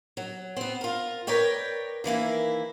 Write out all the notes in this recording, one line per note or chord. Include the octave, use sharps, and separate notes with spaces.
F#3
B3 C4
F4 A#4
A#4 B4 C#5 D5 G5
D#3 E3 A#3 E4